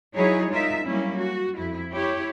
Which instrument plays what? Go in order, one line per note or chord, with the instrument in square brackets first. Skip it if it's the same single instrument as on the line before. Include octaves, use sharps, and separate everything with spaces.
[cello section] F#3 D#4 E4 G#4 C#5
G#3 D#4 F4 A#4 E5
F#3 G3 A#3 C#4 E4
F#4
F2 E4
E4 G4 C#5